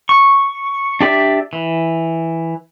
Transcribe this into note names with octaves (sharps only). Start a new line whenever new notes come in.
C#6
D4 G4 D5 E5
E3